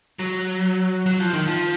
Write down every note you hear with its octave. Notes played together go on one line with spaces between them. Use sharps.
F#3
F#3
F3
D#3
F3